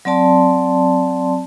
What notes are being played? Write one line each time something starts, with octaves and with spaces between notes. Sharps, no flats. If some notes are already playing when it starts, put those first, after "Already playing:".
F#3 C4 D5 A5 C6